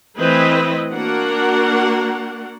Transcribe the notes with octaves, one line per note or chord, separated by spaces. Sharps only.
E3 A3 C4 E4 B4 D#5
A#3 D4 F#4 A#4 F#5